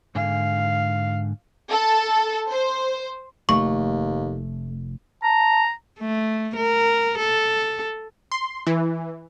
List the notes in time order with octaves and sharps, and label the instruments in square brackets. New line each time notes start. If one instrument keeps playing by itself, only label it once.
[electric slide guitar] G#2 D3 G#5 [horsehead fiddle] F5
[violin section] A4
C5
[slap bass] F1 [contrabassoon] D#2 [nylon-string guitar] A3 [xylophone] C#6
[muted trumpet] A5 [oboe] A#5
[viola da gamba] A3
A#4
A4
[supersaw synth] C6
E3